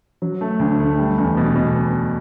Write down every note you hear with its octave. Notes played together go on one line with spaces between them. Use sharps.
F#3
A3
D2
A3
G3
E2
B2
B2